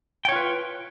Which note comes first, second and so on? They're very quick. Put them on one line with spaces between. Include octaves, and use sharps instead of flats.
G5 C#5 F4 B4